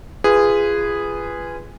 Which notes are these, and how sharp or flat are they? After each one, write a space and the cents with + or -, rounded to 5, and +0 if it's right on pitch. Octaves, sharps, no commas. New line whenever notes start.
F4 -25 G#4 -10 B4 +0